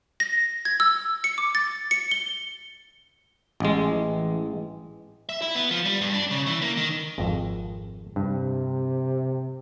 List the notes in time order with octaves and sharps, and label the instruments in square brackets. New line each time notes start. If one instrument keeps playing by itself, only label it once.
[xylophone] A#6
G#6
E6
C#7
D6
A6
C#7
G7
[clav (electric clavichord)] A1 G#3
[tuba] E3
[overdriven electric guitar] E5
E4
B3
F3
G3
G2
D4
C#3
E3
A#3
D#3
[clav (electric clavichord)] G#1 F2
[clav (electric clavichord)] G2 [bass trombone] C3